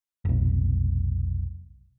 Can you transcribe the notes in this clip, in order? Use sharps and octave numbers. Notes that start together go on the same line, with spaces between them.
F1 B1